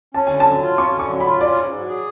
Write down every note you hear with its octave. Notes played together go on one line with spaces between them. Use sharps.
C#4 A5
D3 G#5
A5
F#3
F4
C#4 C#6
D3
C#6
F#3
F4 B5
C#4 D5
G#2
F#3
G#4